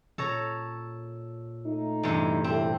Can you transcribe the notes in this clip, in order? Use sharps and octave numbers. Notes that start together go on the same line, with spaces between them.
A#2 A4 C#5 A#5
A3 D#4
E2 G2 C3
A2 C3 A3 C4